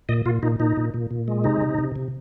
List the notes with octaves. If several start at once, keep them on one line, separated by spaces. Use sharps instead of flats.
A#2 D#5
A#2 F4
A#2 D#4
A#2 D#4
A#2
A#2
A#2
G#3
C3 D#4
C3
C3
C3